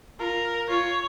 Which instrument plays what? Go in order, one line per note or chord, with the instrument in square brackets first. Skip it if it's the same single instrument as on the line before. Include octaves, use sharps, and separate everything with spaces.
[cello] F4 [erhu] A#4
[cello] F4 [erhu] C#5